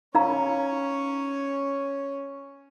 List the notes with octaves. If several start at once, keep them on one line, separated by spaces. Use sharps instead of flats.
C#4 D#4 C#5 F5 A#5